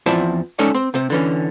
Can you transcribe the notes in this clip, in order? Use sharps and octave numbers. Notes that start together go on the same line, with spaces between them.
E2 F3 C4 E4 D5 A5
G#3 C#4 D#4 A4 C#5 D5
C4
C3 C4
D3 E3 C#4